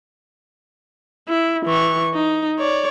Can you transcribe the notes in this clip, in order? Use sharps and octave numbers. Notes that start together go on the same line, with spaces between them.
E4
E3 C#6
D#4
C#5 D5